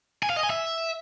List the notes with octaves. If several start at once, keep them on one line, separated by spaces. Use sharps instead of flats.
G#5
F5
D#5
G#5
E5